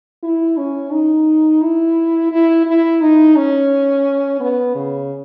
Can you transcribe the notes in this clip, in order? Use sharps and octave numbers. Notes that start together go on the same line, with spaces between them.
E4
C#4
D#4
E4
E4
E4
D#4
C#4
B3
C#3